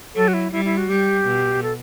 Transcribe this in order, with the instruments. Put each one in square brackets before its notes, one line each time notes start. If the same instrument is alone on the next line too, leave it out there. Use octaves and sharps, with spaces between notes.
[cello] F#3 [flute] A4
[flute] F#4
E4
[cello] G3 [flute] E4
[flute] E4
F#4
[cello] G3 [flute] G4
[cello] B2
[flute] A4